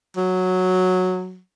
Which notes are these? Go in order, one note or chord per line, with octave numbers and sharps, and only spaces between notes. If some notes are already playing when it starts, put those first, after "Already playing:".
F#3